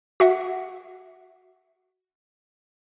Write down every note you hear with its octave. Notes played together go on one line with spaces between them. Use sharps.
F#4 E5 F#5